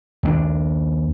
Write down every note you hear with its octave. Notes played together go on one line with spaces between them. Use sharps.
D#2 G#3 D4